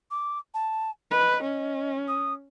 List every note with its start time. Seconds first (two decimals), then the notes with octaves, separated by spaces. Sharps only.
0.10 D6
0.54 A5
1.11 B4 D#5
1.43 C#4
2.08 D#6